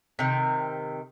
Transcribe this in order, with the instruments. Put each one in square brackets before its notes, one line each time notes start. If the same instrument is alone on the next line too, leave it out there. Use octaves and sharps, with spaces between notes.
[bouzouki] C3 D#3